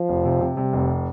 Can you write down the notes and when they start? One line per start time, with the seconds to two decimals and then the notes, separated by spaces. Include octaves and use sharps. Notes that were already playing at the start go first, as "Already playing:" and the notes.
Already playing: F3
0.09 F1
0.25 C3
0.41 C3
0.57 C3 G3
0.73 F1